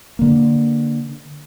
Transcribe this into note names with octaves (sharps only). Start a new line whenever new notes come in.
D3 A#3